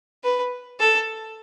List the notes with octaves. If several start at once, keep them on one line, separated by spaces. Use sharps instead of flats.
B4
A4